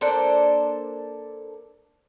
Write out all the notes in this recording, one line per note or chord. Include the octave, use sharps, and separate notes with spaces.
A#3 D4 A4 C5